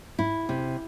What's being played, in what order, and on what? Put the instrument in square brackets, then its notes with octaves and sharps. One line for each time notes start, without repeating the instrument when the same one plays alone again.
[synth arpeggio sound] G#2 [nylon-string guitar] E4
[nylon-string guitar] C3